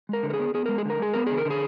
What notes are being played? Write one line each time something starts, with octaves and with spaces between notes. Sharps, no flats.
G#3 A#4
D3
A#4
G#4
B3
B3 G#4
G#3 A#4
G#4
D3 A#4
G#3 G#4
B3 A#4
D3 G#4
A#4
D3
G#4